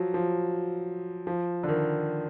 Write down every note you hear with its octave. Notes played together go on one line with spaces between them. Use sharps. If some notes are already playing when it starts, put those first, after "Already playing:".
Already playing: F3 F#3
F3
F3
D3
D#3